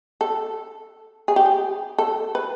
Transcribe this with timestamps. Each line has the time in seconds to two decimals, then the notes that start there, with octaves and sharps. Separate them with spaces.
0.21 A4
1.28 G#4
1.36 G4
1.46 G#4
1.98 A4
2.35 B4